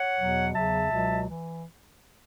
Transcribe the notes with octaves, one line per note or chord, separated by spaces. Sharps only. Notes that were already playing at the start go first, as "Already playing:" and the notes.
Already playing: C#5 F#5
E2 B2 F#3
E2 C#3 F#3 E5 A5
C#2 B2 F#3
E3